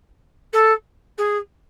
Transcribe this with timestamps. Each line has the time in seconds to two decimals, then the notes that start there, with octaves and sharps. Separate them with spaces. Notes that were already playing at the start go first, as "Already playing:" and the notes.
0.53 A4
1.18 G#4